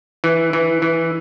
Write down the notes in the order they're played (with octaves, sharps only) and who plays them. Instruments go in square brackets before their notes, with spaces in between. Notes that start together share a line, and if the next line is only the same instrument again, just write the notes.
[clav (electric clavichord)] E3
E3
E3